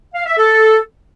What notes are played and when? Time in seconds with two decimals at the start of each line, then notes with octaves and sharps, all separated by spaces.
0.15 F5
0.26 E5
0.38 A4